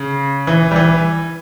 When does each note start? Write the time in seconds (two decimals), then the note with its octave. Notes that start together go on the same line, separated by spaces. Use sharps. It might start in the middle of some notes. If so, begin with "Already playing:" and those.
Already playing: C#3
0.47 E3
0.71 G3
0.76 E3